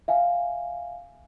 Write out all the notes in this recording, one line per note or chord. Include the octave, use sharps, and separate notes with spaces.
E5 F5 G#5